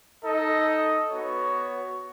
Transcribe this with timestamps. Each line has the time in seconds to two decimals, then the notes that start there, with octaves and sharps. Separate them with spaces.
0.24 D#4 A4 D#5
1.09 B3 F#4 C#5